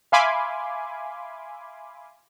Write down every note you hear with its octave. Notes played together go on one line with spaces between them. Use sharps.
E5 F5 G#5 B5 C6 D6